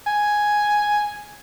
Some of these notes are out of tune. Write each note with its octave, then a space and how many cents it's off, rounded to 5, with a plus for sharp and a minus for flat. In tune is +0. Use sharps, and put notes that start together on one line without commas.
G#5 +0